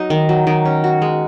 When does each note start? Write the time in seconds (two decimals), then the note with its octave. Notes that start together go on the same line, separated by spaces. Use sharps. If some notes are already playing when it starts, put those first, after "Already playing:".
Already playing: F#3 D#4
0.10 D#3
0.29 F#3
0.47 D#3
0.65 C#4
0.84 F#4
1.02 G#3